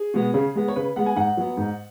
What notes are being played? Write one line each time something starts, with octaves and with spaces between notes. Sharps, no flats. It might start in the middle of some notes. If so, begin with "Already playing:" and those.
Already playing: G#4
B2 G#3 B3
C#3
G#3 B3
C#5
C#3 B4
G#3 B3 F#5
G#5
G#2 F#5
F#3 B3
G#2